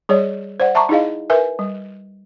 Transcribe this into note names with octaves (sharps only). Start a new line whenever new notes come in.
G3 G#4 C#5 D5
C5 D5 F#5
E5 A5 A#5 C#6 D6
D#4 E4 G#4 D#5 F5
A#4 B4 E5 G#5
G3